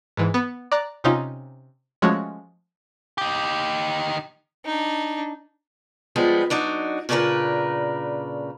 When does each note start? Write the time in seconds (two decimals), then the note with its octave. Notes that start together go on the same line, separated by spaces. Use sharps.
0.17 G#2 E3
0.34 B3
0.72 D5 A#5 F#6
1.04 C3 C#4 D#4 F4
2.02 F3 G#3 A3 C#4 F#4
3.18 D#4 G4
4.65 D4 D#4
6.16 F3 G3 G#3 B3
6.50 F#3 D4 D#4 F#4
7.09 A#2 C#3 D4 E4 A#4 B4